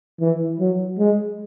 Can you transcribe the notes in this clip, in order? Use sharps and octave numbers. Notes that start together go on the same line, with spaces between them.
E3
F#3
G#3